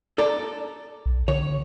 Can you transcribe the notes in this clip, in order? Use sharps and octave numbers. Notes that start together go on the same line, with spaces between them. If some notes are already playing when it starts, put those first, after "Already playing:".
A4 D5 A#5
B1
D3 C#5